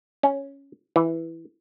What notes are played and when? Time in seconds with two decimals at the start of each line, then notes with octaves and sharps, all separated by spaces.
0.23 C#4
0.96 E3